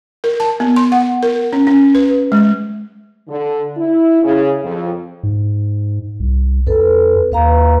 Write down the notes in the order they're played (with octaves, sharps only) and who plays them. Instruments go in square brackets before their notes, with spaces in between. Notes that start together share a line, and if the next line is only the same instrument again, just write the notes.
[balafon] A#4
A5
B3
C6
F#5
A#4
C#4
C#4
B4
G#3
[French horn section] D3
E4
C#3
F2
[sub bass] G#2
C2
[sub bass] F2 [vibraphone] A4 B4
[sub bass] D#2 [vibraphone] B4 F5 A#5